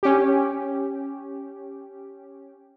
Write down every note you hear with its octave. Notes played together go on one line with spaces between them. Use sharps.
C#4 G4